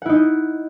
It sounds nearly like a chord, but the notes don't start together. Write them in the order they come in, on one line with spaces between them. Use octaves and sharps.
F#5 E4 D#4